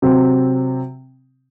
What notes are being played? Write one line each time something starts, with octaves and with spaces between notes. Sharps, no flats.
C3 F#3 C4